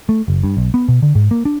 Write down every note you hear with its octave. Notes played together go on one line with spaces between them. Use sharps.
A3
F#1
G2
B1
B3
B2
D3
G#2
A#3
D4